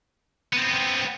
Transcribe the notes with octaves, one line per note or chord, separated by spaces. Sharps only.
B3 C4